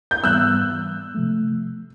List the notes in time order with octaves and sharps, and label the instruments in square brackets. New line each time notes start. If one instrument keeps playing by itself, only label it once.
[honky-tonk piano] G6
[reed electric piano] G#2 E3 G3 B3 [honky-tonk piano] E6 F#6
[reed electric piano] C3 F3 A3